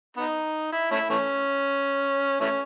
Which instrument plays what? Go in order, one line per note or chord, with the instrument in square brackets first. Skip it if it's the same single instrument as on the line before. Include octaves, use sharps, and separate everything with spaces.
[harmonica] B3 D#4
E4
A3 C#4 E4
E3 A3 C#4
E3 A3 C#4